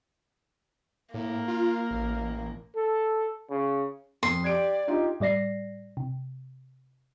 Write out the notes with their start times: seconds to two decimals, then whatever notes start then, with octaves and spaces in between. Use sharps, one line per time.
1.14 A2 A#3
1.48 F4
1.91 A1
2.76 A4
3.50 C#3
4.23 F2 C6
4.44 G4 D5 G#6 D7
4.88 D#4 F4 G4
5.20 A2 G3 D5 A#6 C7
5.97 C3